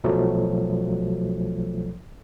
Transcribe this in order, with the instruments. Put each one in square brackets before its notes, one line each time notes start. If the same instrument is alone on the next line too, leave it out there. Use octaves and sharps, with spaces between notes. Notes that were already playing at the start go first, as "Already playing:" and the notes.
[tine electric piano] B1 B2 F3 F#3 A3